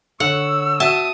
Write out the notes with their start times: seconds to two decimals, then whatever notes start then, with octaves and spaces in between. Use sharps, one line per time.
0.20 D3 C#5 F#5 E6
0.80 F#4 E5 A5 D#6